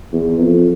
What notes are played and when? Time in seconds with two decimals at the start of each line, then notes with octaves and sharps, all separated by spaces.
0.13 E2
0.40 F2